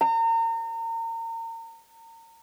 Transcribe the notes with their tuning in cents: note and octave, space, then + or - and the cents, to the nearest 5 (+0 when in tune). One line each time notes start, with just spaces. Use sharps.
A#5 -35